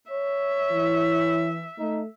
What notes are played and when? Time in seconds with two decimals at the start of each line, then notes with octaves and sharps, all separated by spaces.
0.11 C#5 E5
0.72 E3 E4
1.79 A3 D#4